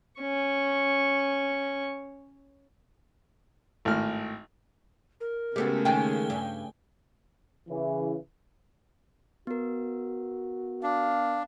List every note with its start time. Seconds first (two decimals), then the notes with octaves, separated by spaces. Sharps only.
0.21 C#4 C#6
3.85 G#1 A2 F6
5.21 A#4
5.56 C#3 G#3 A3 B3 C#4 F#4 G4 A4
5.85 D#3 G#3 A#3 G5 G#5
6.30 G2
7.69 C#3 E3
9.47 B3 F#4 A#4
10.83 D4 F5